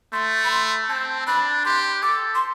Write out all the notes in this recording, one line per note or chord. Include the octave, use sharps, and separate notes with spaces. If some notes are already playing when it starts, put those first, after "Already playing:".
A3 C6
B5
C6
C4 A5
D4 B5
G4 C6
A4 D6
C6